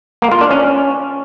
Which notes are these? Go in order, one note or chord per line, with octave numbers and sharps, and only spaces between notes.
A#3
F4
D4
C#4